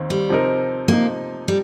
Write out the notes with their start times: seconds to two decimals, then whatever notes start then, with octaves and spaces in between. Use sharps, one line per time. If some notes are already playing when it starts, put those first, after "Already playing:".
Already playing: D#2 D#3 C4
0.10 G3
0.29 C3 F3 C4 D#4 A#4
0.88 C3 F3 A#3 D#4
1.48 G3